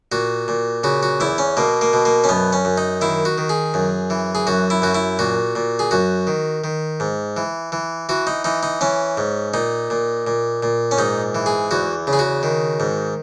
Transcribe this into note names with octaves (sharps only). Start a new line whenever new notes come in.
A#2 F#4
A#2
C#3 F#4
F#4
E2 E4
C#4
B2 A#3
A#3
B2
A#3
C#4
F#2 B3
C#4
F#2
D#4
D#3 E4
F#4
D#3
G#4
F#2
E3
G#4
F#2 F#4
E4
F#2 F#4
E4
A#2 F#4
A#2
G#4
F#2 F#4
D#3
D#3
G#2
E3
E3
E3 F#4
D#4
E3 D#4
D#4
E3 C#4
G#2
A#2 D#4
A#2
A#2
A#2
C#4
G#2 D#4
E3
G#4
E2 F#4
C#3
G#4
F#4
D#3
G#2